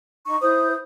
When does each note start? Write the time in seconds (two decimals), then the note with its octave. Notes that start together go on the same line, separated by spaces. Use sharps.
0.26 D#4 C#6
0.42 E4 C5 D#6 G6